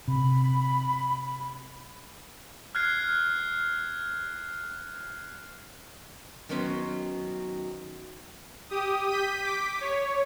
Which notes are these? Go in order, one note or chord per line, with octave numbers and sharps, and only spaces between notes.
C3 B5
F6 F#6 G#6 C7
D#3 F#3 B3 C#4 C5
G4 D#6
G6 B6 D#7
D6 B6
C#5